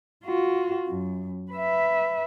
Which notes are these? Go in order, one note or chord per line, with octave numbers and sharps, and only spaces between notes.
F4 F#4
F#2
B4 E5